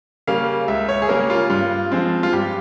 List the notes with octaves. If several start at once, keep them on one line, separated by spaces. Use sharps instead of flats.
C#3 G3 A#3 C#4 F5
C#2 E5
C#5
G#4
C#3 G3 A#3 C#4 A#4
F4
G2 F4
F3 G#3 C4
F4
G2 G4